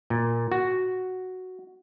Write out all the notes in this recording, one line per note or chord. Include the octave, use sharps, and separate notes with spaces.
A#2
F#4